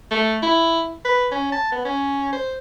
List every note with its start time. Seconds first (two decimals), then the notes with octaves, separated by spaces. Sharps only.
0.11 A3
0.42 E4
1.05 B4
1.31 C#4
1.52 A5
1.72 B3
1.85 C#4
2.33 C5